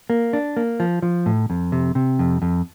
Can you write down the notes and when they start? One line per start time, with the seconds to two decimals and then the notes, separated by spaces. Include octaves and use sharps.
0.10 A#3
0.33 D4
0.57 A#3
0.80 F3
1.02 F3
1.26 A2
1.50 F2
1.72 C3
1.95 C3
2.19 F2
2.42 F2